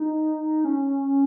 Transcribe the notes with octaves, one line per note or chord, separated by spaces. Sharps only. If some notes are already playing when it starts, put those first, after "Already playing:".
Already playing: D#4
C#4